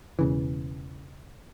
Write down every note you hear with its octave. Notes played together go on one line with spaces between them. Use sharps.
E1 C#3 E3